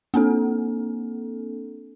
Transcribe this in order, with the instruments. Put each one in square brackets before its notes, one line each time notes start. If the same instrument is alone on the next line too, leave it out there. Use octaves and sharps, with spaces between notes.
[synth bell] A#3 C4 D4 A4